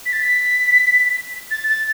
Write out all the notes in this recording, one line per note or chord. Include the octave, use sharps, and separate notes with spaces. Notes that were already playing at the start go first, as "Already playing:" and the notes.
B6
A6
B6
A6
A6